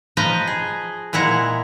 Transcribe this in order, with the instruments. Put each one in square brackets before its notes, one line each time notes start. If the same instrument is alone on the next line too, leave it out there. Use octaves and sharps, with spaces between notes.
[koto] F3 B4 D#5 A#5
G#4
A#2 G#3 E4 F#5 A#5